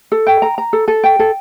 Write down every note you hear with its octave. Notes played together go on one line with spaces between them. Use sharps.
A4
G5
A#5
A#5
A4
A4
G5
A4